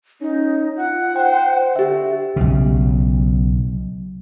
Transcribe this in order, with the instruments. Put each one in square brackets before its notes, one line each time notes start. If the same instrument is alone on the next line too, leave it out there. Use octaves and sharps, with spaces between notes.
[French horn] C#4 [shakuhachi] D#4
[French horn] F4 [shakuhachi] F#5
[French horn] C5 [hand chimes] G5
[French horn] D3 [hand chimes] G4 E5
[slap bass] B1 C#3